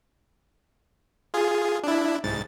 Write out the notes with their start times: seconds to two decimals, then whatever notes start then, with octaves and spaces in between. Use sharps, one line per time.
1.34 F4 G#4
1.84 D4 E4
2.23 C2 G#2 A6